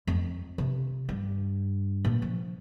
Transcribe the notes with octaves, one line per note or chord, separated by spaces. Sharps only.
F2
C3 F4
G2
A#2
F3